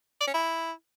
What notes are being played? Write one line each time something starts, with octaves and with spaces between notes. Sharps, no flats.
D5
C#4
E4